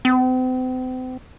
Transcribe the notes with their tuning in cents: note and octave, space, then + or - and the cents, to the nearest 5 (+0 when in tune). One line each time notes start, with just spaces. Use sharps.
C4 -40